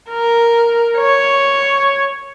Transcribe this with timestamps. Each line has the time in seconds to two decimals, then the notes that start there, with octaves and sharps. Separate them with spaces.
0.10 A#4
0.97 C#5